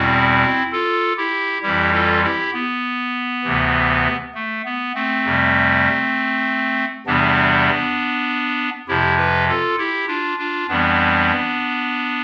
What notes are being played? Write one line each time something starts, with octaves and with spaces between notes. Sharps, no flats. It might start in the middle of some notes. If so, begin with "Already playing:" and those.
Already playing: E2 B2 G3 C4 E4
F4 A4
E4 G4
F2 E3 G3 E4 G4
F4 A4
E4 G4
B3
D2 C3 E3
A3
B3
A3 C4
F2 C3 G3
E2 C3 E3 G3 B3 D4
F2 C3 F3 E4 G4
G4 B4
F4 A4
E4 G4
D4 F4
D4 F4
F2 E3 G3 B3 D4